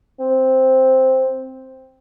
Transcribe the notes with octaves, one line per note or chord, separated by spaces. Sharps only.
C4